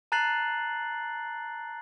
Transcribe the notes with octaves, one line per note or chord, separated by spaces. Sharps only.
A5 A#5 F#6 A6 C7 F#7